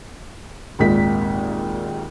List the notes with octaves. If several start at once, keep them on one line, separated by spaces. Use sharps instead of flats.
G#1 D#2 A#2 G#3 B6